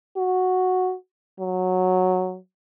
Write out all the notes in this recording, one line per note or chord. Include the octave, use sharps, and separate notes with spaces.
F#4
F#3